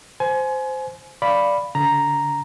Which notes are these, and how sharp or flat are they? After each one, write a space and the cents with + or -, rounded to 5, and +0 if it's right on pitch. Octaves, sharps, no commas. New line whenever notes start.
C5 -10 G#5 +25
D5 +0 F5 -10 B5 +0
D3 -40 A#5 +0